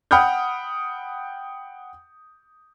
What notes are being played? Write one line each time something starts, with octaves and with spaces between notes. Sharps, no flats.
F#5 G5 B5 D#6 F6 G6